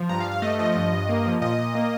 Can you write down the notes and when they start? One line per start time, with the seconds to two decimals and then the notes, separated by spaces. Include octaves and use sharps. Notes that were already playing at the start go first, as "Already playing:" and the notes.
Already playing: F3
0.09 G2 A#5
0.20 F5
0.26 G2
0.31 F5
0.42 A3 D#5
0.59 F3 D#5
0.76 G2
0.93 G2
1.09 A#3
1.26 F3
1.42 A#2 D#5
1.58 A#2
1.75 A#3